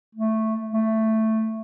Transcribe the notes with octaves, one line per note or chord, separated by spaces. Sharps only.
A3
A3